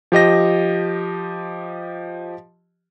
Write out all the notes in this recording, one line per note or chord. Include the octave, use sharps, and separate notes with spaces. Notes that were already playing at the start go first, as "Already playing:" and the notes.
F3 G4 D#5 A#6